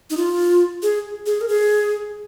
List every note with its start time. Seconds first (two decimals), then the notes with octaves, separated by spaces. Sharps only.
0.10 D#4
0.17 F4
0.82 G#4
1.26 G#4
1.41 A#4
1.48 G#4